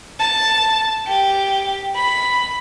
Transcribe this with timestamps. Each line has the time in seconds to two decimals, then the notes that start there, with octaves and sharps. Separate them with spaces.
0.19 A5
1.07 G4
1.95 B5